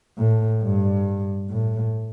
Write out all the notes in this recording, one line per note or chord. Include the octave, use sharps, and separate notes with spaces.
A2
G2
A2